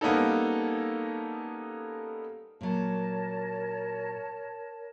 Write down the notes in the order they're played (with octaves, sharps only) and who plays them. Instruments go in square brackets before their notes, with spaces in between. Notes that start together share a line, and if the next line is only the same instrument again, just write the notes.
[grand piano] G3 A#3 B3 C#4 D#4 A4
[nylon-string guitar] A#2 F#3 [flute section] A#4 C#5 A5